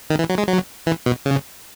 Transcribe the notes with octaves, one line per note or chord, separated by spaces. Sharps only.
D#3
E3
F#3
G#3
F#3
E3
B2
C#3